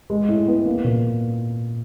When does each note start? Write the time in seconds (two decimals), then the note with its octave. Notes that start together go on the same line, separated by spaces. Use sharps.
0.10 G#3
0.28 A2
0.48 B3
0.66 A#3
0.84 A#2